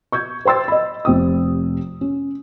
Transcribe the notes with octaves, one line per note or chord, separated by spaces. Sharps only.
C#6 G6 G#6
C5 G5 C6 E6 A6
D#5 B5
F1 C3 G5 D#6
C#4